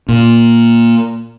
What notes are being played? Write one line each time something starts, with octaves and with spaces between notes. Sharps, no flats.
A#2